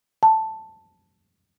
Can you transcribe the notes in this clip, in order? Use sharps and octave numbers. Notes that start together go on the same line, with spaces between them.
A5